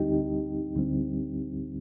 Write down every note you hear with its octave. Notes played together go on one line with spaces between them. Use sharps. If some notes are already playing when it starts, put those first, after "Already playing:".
Already playing: D2 D3 G3 C4 D#4 G4
D2 D3 G3 C4